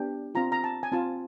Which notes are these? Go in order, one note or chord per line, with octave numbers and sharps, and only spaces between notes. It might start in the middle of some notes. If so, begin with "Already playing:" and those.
Already playing: B3 D4 G4
C4 F4 A#5
A#5
A5
G#5
C4 F4 A5